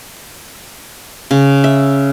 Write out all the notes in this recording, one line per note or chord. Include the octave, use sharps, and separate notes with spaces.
C#3
E5